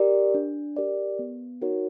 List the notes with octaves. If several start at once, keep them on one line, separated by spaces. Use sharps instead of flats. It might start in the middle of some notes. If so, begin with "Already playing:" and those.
Already playing: G4 A#4 D5
D4
G4 A#4 D5
B3
D#4 F#4 A#4 C#5